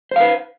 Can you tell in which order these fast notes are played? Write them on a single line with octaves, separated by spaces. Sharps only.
C5 F5 B4